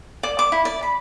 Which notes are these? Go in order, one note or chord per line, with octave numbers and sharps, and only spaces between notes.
D5
D6
E4
D5
B5